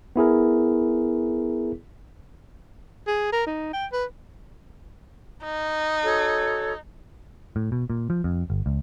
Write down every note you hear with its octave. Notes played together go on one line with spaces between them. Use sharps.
B3 E4 G#4 A#4
G#4
A#4
D#4
G5
B4
D#4
F#4 A4 C#5
A2
B2
A#2
F3
F2
G1
C#2